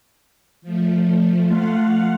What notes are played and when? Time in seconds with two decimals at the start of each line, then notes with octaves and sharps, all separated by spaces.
0.62 F3 A3
1.46 F3 A3 F4 F5 F#5